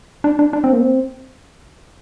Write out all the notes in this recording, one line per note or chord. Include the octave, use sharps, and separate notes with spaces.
D4
D4
D4
C4
A#3
C4